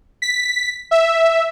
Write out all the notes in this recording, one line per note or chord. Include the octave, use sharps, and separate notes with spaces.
B6
E5